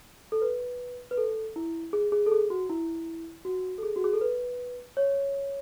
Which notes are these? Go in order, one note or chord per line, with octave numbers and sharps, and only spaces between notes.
A4
B4
B4
A4
E4
G#4
G#4
A4
G#4
F#4
E4
F#4
A4
G#4
F#4
G#4
A4
B4
C#5